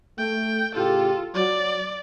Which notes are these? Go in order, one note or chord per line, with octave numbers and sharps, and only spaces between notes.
A3 G5
A2 C#3 F4 G4 A4
F#3 D5